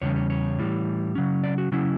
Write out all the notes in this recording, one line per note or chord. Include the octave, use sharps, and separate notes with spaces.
E2 C#3 G3 C#4 C#5
C#5
C#5
A2 E3 G3
C#3 F#3 C#4
D5
F#4
C#3 F#3 C#4 E4